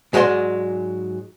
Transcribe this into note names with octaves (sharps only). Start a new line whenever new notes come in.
G#2 F#3 G#3 B4 D5 C6